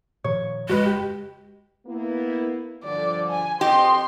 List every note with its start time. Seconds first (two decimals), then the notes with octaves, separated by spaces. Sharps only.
0.24 A#2 D#3 F3 C#5
0.69 F#1 G#3 F#4 B4 D#5
0.86 G4
1.87 A#3 B3 E4
2.84 G2 D3 F3 D5
3.30 G#5
3.61 F2 G4 D#5 C6